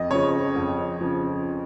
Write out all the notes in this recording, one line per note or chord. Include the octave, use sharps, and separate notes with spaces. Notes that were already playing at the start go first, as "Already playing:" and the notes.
Already playing: F2 D#5
C#3 F3 C#5
F2
C#3 F3